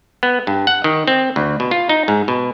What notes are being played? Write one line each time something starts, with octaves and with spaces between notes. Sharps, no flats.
B3
G2
F#5
D#3
C4
D2
B2
F4
D#4
G#2
B2